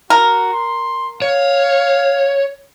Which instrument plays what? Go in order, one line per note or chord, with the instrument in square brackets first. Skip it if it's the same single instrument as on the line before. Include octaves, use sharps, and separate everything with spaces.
[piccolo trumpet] F#4 [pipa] A#4
[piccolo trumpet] C6
[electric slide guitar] C#5 [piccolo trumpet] F5